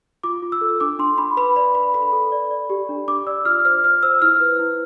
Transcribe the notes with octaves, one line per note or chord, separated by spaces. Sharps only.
F4 D6
F4
E6
A4
D4 D6
D4 C6
D4 B5
B4 B5
D5 B5
B4 B5
A4 B5
A4
D5
D5
G4
D4
D4 D6
D5 E6
F4 F6
C5 F6
C5 F6
C5 E6
E4 F6
B4
E4